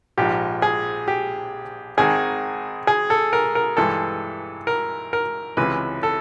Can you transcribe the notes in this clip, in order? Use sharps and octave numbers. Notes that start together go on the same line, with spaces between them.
A#1 G#2 F3 G4
G#4
G4
G#1 G#2 D#3 G#4
G#4
A4
A#4
A#4
G2 E3 G#3 A4
A#4
A#4
C#2 C3 E3 G#3 B4
A4